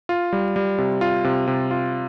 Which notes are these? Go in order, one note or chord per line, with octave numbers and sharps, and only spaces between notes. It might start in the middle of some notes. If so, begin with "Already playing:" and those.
F4
G3
G3
C3
F4
C3
C3
F4